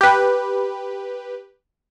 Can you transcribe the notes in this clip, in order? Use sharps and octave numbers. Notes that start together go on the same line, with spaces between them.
G4 B4